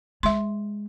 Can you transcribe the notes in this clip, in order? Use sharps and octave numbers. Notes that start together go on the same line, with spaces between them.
G#3 E5 C6